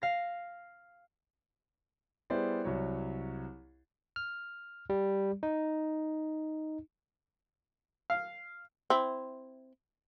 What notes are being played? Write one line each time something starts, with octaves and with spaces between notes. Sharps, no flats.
F5 A#6
G3 B3 E4 G#4 C5 D5
C2 F#3 C#5
F6
G3
D#4
F5
C4 E4